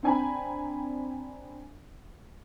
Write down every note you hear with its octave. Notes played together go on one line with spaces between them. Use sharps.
C4 D4 G5 G#5 A#5 B5